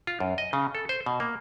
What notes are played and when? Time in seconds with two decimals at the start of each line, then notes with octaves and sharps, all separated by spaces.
0.07 F4
0.20 F#2
0.38 D#5
0.53 C#3
0.75 A4
0.89 C5
1.06 B2
1.20 A#3